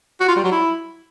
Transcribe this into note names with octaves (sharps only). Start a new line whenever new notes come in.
F#4
F4
G3
F#3
E4